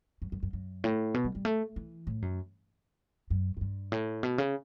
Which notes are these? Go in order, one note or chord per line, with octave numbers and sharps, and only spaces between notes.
F#2
F#2
F#2
F#2
A2
B2
G3
G3
A3
E3
A2
F#2
F#2
F#2
G2
A2
B2
C#3